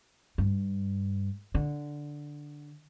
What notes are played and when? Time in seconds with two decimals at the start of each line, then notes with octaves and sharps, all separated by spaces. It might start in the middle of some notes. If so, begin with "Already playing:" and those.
0.38 G2
1.55 D3